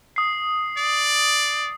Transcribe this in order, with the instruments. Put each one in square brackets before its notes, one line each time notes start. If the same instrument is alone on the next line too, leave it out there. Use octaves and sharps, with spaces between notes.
[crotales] D#6 C7
[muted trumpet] D5